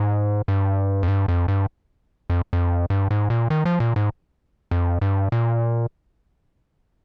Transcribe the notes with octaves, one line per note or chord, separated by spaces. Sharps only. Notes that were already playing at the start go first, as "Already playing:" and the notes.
Already playing: G#2
G2
F2
G2
F2
G2
F2
F2
G2
G#2
A#2
D#3
F3
A#2
G#2
F2
G2
A#2